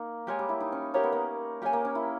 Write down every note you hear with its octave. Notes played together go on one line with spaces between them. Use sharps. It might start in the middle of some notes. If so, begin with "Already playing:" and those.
Already playing: A#3 D#4
G#3 G4 A#4 C#5 G#5
G3
E4
D#4
C#4
A#3 G4 A#4 C#5
B3
A#3
A#3 G4 A#4 C#5 G#5
A#3
C#4
E4